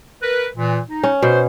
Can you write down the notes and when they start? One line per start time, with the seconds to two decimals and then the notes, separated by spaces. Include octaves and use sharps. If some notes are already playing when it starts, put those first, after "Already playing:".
0.22 A#4 B4
0.56 A#2 E3
0.89 D#4
1.04 C#4
1.22 B2 C5